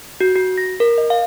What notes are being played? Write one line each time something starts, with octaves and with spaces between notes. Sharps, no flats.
F#4
F#4
A#6
A#4
D#5
F5